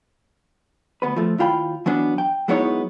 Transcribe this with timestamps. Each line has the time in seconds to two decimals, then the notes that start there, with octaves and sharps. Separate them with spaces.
1.02 D2 B3 B4
1.16 F3 A3
1.38 D#2 E4 F4 G5 B5
1.86 E3 F#3 B3 D4
2.18 G5
2.48 F#3 G#3 B3 D#4 E4 C#5